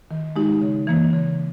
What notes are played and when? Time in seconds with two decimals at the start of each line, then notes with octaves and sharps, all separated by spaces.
0.11 D#3
0.36 G#3 D#4 G4
0.61 C#3
0.87 E3 A#3
1.13 C#3